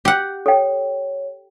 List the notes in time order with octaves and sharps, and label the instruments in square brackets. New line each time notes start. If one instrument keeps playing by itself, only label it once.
[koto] G4 F#5
[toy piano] A4 G5 [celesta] C#5